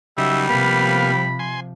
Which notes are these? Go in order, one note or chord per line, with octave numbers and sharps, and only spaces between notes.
C#3 F#3 G3 D#4 E5
C3 F3 A#3 B3 F5 B5
G#5 C6